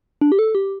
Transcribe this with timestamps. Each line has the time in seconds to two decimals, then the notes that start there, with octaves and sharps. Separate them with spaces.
0.21 D4
0.32 G4
0.39 A4
0.55 G4